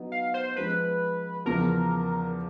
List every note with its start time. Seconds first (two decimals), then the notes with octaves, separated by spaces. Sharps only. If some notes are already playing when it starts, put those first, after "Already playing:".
Already playing: F#3 B3 D#4
0.12 F5
0.34 C5
0.56 F3 G#3 C#4 B4
1.46 E2 C#3 F3 A#4